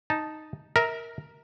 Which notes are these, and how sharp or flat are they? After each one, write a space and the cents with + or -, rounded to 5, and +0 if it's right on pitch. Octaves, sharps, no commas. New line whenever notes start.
D#4 -5 A5 +0
A#4 +0 E5 -35